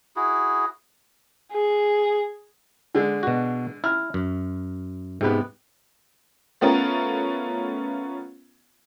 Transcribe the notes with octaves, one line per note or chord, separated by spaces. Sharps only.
E4 F#4 G#4
G#4
D3 G#3
B2 F#4
E4 F6
F#2
G#2 C3 G#3 B3
A3 B3 C#4 F4 A#4